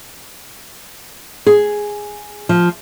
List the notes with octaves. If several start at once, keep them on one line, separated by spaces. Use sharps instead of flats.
G#4
F3